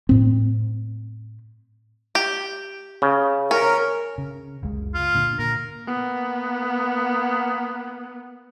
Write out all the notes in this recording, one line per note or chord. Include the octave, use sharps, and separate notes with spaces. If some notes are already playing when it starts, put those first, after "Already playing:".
A2 C4
G4
C#3
C#4 A#4
C#3
F#1 C#2 G#3
F4
A#2 D3
A#2 A#4
A#3 B3